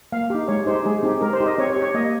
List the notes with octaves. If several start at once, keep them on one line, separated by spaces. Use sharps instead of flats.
A#3 F5
D#4 G4
G#3 C#5
D#4 G4 C5
G#3 G#4
C4 D#4 G4
G#3 A#4
C5
D#4 G4
D#5
C4 C#5
C#5
G4
C#5
A#3 D#5